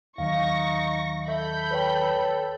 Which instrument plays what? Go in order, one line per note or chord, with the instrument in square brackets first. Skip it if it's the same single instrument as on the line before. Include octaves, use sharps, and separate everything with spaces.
[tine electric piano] D#2 D#3 F#3 [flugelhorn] D#4 [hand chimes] F5 [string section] C#6 A#6
[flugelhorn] A4 [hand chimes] E5 [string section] B5 G6
[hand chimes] B4 C#5 G5